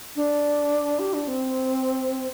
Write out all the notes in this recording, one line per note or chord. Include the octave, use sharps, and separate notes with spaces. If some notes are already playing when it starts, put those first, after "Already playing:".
D4
G4
D4
C4